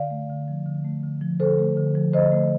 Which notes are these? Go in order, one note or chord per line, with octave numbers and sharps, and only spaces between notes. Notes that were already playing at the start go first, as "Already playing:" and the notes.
Already playing: D3 D5 F5
A3
D3
F3
D3
A3
D3
F3
D3 A4 C5
A3
D3
F3
D3 C5 D#5
A3